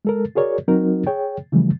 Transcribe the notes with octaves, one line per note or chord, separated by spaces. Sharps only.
G#3 A4 A#4
F#4 G#4 A#4 C#5 D5
F#3 C4 D#4 F#4 A#4
G#4 C#5 G5
C#3 E3 F3 G3 A3